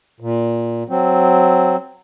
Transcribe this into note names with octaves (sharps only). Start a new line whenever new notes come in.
A#2
F#3 C4